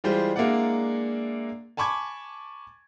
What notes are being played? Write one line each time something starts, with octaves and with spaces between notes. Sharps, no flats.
E3 G3 G#3 F4 C5
G#3 A#3 D4 E4 D5 F#5
G#5 A5 B5 C#6 D6 G#6